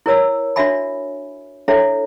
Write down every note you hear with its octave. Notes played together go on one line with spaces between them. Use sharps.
E4 A#4 C#5 E6
D4 F#4 C#5 E5 G#5 B5
D4 E4 A4 C#5 E5